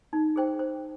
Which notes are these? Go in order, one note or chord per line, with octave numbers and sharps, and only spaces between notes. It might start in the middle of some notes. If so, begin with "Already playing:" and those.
D#4
G#4 C5 G5
C5